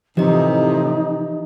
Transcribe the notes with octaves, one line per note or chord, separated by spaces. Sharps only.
A2 C3 E3 F3 D#4 G4 D#5